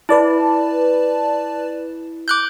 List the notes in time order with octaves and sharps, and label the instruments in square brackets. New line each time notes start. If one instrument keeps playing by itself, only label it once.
[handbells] E4 [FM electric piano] B4 D5 A5
[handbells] D6 F#6 G6